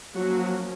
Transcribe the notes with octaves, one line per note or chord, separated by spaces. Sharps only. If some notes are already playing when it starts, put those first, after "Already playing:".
F3 F#3 A#3 C#4 F#4